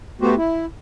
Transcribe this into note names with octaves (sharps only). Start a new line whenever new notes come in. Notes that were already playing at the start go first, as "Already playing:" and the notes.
A3 B3 F#4 G4 C5
E4